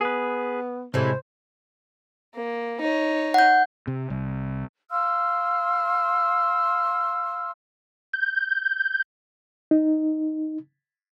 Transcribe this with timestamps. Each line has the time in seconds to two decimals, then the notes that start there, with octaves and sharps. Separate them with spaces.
0.01 B3 G#4 B4
0.94 A2 C3 E3 G#3 C5
2.35 A#3
2.81 D#4 C#5
3.34 F#5 G6
3.87 C3
4.10 C2
4.90 F5 C6 E6 F6
8.13 G6
9.71 D#4